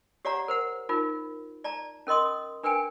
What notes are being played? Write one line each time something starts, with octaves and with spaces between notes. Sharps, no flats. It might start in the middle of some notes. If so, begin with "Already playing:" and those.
G4 C#5 D5 F5 F#5 A#5
A#4 C5 F#5
D#4 F4 A#4
D5 A5 A#5
C#4 A#4 D#5 C6 D#6
D4 A#4 B4 G5 G#5